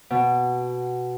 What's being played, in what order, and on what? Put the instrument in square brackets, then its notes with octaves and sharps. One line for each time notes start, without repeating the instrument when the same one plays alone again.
[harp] B2